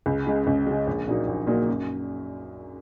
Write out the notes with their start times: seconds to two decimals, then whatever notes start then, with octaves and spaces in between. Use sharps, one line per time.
0.06 C#2
0.27 C#3 G#3
0.47 C#2
0.67 C#3 G#3
0.87 A#1
1.08 A#2 F#3 A#3 D#4
1.28 A#1
1.47 A#2 F#3 A#3 D#4
1.68 F#2